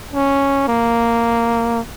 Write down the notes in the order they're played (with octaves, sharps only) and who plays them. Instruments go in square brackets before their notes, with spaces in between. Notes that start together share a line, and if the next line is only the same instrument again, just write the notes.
[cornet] C#4
A#3